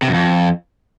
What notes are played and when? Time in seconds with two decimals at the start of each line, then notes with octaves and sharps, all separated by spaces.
0.02 C3
0.08 F#2
0.14 F2